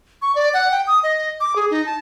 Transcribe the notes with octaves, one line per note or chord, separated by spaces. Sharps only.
C#6
D5
F#5
G5
D#6
D#5
D6
G#4
D#4
A5